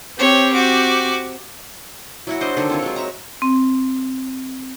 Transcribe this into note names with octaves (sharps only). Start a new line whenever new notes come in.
C4 G4 C#5 G5
F#4 D6
F#3 E4 F#4
D4 C5 D#5
D3 D#3 A4
C4 F4 C#5
F#3 G#3
C#5 E5 A#5
C4